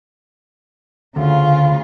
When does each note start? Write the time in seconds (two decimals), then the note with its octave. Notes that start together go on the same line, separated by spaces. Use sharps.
1.16 D2 C#3 F4